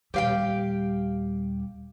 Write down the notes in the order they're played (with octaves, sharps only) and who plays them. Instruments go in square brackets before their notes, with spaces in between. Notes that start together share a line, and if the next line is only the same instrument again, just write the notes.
[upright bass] D#1 G3 [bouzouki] G4 F5 G5